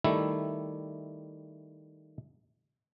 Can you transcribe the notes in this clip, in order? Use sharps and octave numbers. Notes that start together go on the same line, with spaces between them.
D#3 G3 A3 E4